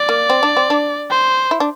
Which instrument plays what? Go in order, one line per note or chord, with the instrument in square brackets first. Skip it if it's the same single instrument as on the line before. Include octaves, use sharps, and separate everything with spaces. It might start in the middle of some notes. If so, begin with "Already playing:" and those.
Already playing: [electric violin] D5
[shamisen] A#3
C4
D4
C4
D4
[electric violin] C5
[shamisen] E4
D4